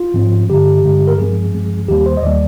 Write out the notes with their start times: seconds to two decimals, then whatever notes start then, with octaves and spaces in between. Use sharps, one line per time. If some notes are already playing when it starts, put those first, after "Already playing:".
Already playing: F4
0.14 G#2 F3 C4
0.49 G2 D3 G#3 G4
0.84 G2 D3 G#3
1.08 A#4
1.18 G2 F3 G#3 C4 G#4
1.54 G2 F3 G#3 C4
1.88 D#2 D#3 G3 A#3 G4
2.06 C5
2.17 D#5
2.22 D#2 D#3 G3 A#3 D5